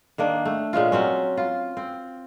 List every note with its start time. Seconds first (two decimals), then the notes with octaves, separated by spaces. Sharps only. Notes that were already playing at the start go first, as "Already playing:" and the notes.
0.18 D#3 A#3 D4
0.45 A3
0.73 A#2 G#3 C#4 F4
0.92 F#3 C4 C#4
1.37 F4
1.77 C4